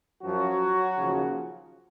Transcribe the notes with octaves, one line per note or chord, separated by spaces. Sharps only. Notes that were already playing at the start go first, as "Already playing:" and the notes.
F#2 F3 F#3 F#4
D#2 C#3 F3